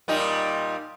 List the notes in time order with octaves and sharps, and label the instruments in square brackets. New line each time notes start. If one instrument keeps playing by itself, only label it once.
[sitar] A#2 G3 D#4